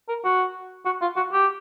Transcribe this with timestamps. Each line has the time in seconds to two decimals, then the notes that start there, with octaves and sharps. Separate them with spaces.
0.08 A#4
0.24 F#4
0.85 F#4
1.02 F4
1.16 F#4
1.33 G4